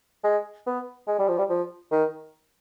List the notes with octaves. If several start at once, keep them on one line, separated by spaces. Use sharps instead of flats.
G#3
B3
G#3
G3
F3
G3
F3
D#3